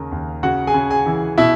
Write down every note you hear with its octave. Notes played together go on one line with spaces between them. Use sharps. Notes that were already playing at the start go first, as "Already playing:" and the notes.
Already playing: D#2 C#3 A#4
D#2
C#3 F#4 F#5
G#4 G#5
C#3
G#4 G#5
E3
B2 E4 E5